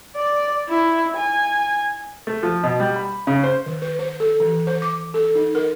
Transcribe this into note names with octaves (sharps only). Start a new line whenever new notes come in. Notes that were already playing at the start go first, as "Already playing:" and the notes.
D5
E4
G#5
A3
F3
B2
G3
B5
C#3
C5
D#3
B4
C5
A4
E3
C5
D6
A4
D#4
A#4